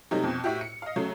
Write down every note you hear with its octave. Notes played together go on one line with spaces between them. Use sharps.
C3 F#3 G3 A3 D#4
F2 B2
A2 E4 F#4 G4
C#7
D#5 F5
C#3 F#3 A3